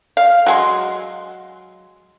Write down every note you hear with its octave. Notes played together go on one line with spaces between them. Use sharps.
F5
F#3 G#3 C6